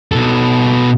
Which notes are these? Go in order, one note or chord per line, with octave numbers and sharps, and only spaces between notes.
B2 A4